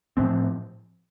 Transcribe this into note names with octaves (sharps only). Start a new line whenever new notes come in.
A2 F3 C4